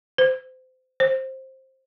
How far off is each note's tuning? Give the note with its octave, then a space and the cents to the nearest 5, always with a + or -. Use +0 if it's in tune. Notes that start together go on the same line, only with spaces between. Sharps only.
C5 -25
C5 +15